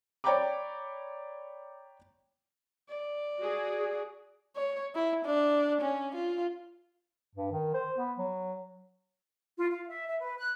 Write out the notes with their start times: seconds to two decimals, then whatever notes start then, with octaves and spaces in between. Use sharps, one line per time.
0.24 C#5 D5 G5 A#5 B5 D6
2.89 D5
3.39 F#4 G#4
4.56 C#5
4.95 E4
5.25 D4
5.81 C#4
6.15 F4
7.36 G2
7.52 D#3
7.74 C5
7.98 B3
8.18 F#3
9.59 F4
9.71 F5
9.88 E5
10.08 E5
10.21 B4
10.38 F#6